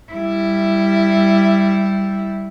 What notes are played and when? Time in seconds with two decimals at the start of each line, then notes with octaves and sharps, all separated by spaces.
0.13 G3 E4